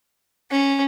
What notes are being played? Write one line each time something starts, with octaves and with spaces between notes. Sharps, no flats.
C#4